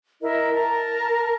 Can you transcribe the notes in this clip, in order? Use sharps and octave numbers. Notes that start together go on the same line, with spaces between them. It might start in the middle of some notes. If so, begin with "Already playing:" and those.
E4 A#4 D#5 E5
A#4 A5 A#5